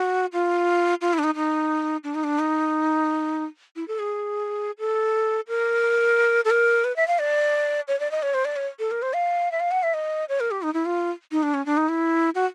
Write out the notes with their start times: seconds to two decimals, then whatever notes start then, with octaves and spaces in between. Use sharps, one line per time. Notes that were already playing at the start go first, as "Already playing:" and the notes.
Already playing: F#4
0.33 F4
1.01 F4
1.13 E4
1.19 D4
1.24 D#4
1.35 D#4
2.04 D4
2.15 D#4
2.24 D4
2.39 D#4
3.76 E4
3.88 A4
3.99 G#4
4.79 A4
5.48 A#4
6.45 A4
6.50 A#4
6.84 B4
6.96 E5
7.08 F5
7.19 D5
7.88 C#5
8.00 D5
8.11 D#5
8.23 C#5
8.34 C5
8.45 D5
8.56 C#5
8.79 A4
8.91 A#4
9.02 C5
9.14 F5
9.52 E5
9.60 F5
9.71 F#5
9.83 E5
9.94 D#5
10.29 C#5
10.40 A#4
10.51 G4
10.62 D#4
10.74 E4
10.86 F4
11.32 D#4
11.43 D4
11.54 C#4
11.66 D4
11.77 D#4
11.89 E4
12.35 F#4